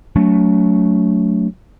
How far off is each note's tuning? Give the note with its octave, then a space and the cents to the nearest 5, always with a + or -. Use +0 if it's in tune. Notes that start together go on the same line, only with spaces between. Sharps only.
F#3 +0 A3 +0 D4 -45